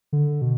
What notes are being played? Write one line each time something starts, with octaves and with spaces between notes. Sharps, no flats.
D3
B2